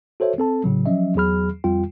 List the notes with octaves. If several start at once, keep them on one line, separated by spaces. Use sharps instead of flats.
F#4 A4 C5 C#5 E5
C4 A4 A5
A2 C#3 F#3
F3 F#3 C#4 D#5 E5
E2 F#3 G#4 B5 F6
F2 G3 F4 G5